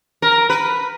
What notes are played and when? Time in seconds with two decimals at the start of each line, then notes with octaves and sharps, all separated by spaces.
0.22 A#4
0.50 B4